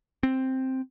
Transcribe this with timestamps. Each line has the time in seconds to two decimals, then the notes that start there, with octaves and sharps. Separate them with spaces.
0.23 C4